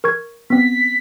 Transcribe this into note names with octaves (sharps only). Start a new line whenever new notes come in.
A#4 C#6 G#6
B3 C4 B6